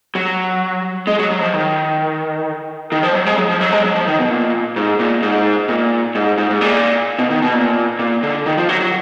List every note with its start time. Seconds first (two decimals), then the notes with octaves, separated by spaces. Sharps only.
0.15 F#3
1.07 G#3
1.19 F#3
1.30 F#3
1.42 F3
1.53 D#3
2.92 D#3
3.03 F3
3.15 F#3
3.26 G#3
3.38 F#3
3.50 F3
3.61 F#3
3.72 G#3
3.84 F#3
3.96 F3
4.07 D#3
4.19 B2
4.30 A#2
4.76 G#2
4.99 A#2
5.23 G#2
5.69 A#2
6.15 G#2
6.38 G#2
6.50 G#2
6.61 A#2
7.19 B2
7.30 D#3
7.42 B2
7.54 A#2
7.99 A#2
8.23 D3
8.46 D#3
8.57 F3
8.69 F#3
8.80 F#3